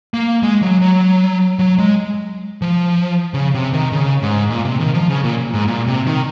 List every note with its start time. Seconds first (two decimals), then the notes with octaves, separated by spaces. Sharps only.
0.14 A#3
0.43 G#3
0.62 F#3
0.82 F#3
1.59 F#3
1.78 G#3
2.62 F3
3.34 C#3
3.54 C3
3.73 D#3
3.92 C#3
4.22 G#2
4.50 A#2
4.65 C3
4.80 D#3
4.94 F3
5.10 C#3
5.24 A#2
5.54 G#2
5.68 A#2
5.87 C3
6.07 D#3